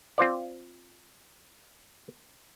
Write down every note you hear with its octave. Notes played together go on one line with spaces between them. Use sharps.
C4 F4 C5 D5